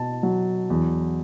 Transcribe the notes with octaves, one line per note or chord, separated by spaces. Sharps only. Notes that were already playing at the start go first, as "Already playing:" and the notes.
Already playing: B2 A5
F#3
E2